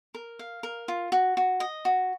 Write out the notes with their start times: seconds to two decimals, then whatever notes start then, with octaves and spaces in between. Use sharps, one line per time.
0.15 A#4
0.39 F5
0.63 A#4
0.88 F4
1.12 F#4
1.37 F#4
1.60 D#5
1.85 F#4